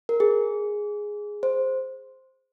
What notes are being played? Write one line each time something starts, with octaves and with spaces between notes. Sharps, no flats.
A#4
G#4
C5